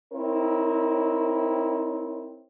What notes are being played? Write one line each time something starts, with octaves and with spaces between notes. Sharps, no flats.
C4 D#4 E4 A#4 C#5